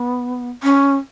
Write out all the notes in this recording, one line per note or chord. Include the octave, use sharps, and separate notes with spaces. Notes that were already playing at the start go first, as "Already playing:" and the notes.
Already playing: B3
C#4